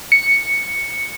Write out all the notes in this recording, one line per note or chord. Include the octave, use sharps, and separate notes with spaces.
C#7